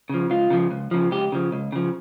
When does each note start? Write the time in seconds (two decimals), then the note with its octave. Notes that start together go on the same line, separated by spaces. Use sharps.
0.10 C#3 F3
0.30 C#2 F4
0.51 C#3 F3
0.71 C#2
0.91 C#3 F3
1.11 C#2 G4
1.32 C#3 F3
1.52 C#2
1.72 C#3 F3